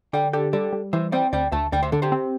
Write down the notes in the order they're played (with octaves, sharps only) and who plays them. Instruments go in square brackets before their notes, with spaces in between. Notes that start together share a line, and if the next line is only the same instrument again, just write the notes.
[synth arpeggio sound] D3 [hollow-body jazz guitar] D5 G5
[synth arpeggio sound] G4 [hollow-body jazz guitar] A4 D5
[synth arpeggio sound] G3 [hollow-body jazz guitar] A4 D5
[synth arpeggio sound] G3
[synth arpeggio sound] E3 [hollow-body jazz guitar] C5 E5
[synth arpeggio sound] C4 [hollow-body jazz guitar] D5 G5
[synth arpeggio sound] D2 [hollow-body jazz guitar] D5 G5
[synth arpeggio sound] D2 [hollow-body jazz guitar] E5 A5
[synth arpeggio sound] D2 [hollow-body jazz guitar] D5 G5
[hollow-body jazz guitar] C5 E5
[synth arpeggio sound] D3 [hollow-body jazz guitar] A4 D5
[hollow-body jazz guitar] G4 C5
[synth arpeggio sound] C4